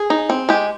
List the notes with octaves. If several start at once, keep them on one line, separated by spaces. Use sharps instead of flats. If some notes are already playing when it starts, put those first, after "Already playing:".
Already playing: G#4
D#4
C4
G#3 G4